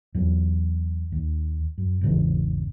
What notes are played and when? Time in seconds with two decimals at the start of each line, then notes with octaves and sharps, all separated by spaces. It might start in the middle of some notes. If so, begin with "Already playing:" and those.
0.14 E2 F#3
1.12 D#2
1.78 F#2
2.01 G#1 E2 C#3 E3